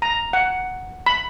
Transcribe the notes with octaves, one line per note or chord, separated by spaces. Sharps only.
A#5
F#5
B5